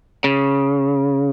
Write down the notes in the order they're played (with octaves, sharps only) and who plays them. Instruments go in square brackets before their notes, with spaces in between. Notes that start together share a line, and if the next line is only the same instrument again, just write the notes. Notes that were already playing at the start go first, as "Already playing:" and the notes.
[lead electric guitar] C#3